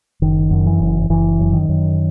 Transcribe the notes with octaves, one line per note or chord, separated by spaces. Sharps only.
F#1 D#3
F#2
E3
F#1
F#1 E3
F#2
D#3
F#2